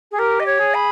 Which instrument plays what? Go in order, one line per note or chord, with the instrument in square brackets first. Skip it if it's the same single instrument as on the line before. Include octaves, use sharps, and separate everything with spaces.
[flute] G#4
[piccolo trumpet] G4 [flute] A#4
[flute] D#5
C#5
[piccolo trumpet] G#4
[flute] B5